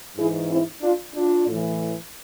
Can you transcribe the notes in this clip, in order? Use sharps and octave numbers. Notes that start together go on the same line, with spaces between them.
G#2 E3 E4 G#4
C4 E4
D4 F4
D4 F4
A2
E3